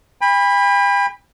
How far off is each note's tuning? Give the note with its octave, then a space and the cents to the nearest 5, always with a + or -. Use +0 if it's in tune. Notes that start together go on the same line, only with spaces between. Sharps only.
G5 +45 B5 -5